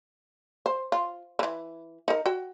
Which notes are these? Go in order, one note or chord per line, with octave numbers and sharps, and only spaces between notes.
C5
F4
D3 E3
D#4 A#4
F#4 G5